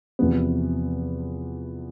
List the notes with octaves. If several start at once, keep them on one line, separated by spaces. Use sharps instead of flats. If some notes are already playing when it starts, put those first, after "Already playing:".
E2 C3 F3 B3